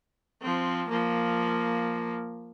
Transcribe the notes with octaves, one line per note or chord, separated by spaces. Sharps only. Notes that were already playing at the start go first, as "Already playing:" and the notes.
F3 C4
F3 A#3